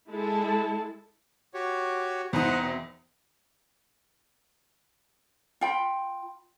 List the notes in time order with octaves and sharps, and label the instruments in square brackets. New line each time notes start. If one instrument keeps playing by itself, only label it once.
[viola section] G#3 E4 A4 A5
[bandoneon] F#4 G4 C#5
[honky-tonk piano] E2 D#4 [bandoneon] B4 C5 F#5
[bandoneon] B2 C4
[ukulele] F4 G5 B5